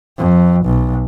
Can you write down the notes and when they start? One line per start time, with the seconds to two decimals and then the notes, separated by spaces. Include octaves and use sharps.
0.18 F2
0.66 B1